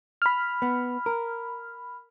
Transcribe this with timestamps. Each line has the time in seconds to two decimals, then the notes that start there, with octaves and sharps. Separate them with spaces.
0.22 B5 F6
0.62 B3
1.06 A#4